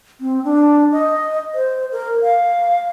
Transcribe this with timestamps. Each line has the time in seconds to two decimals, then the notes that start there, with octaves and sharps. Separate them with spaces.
0.21 C4
0.44 D4
0.92 D#5
1.55 C5
1.92 A#4
2.23 F5